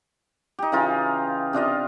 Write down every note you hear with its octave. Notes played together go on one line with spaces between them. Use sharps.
D#4 G4
C#3 E3 D#4 F4
C3 D4 F4 D#5